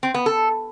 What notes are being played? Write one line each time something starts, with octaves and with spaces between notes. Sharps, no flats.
C4
B3
A4